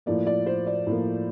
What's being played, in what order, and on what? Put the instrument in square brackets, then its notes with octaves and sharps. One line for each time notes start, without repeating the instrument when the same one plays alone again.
[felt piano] A2 F3 A#3 D5
D5
C5
D5
A2 F3 A#3